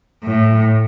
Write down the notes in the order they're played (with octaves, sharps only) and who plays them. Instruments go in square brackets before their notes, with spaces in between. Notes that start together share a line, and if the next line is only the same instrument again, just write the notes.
[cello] A2